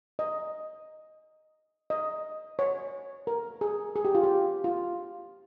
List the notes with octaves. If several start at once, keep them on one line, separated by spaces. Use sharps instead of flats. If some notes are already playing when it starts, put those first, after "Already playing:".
D#5
D#5
C#5
A#4
G#4
G#4
G4
F4
G4
F4